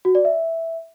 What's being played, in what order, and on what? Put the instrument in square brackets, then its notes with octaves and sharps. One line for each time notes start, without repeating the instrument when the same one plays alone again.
[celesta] F#4
D5
E5